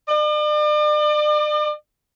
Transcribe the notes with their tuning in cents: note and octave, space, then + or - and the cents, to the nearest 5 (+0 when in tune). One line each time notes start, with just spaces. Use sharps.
D5 +40